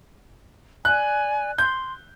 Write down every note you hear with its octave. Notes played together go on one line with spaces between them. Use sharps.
D5 G#5 F#6
C6 G6